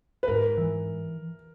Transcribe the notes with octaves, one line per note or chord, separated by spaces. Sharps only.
B4
G#2 A#4
E3